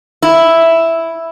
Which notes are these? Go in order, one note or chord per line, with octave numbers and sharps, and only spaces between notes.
E4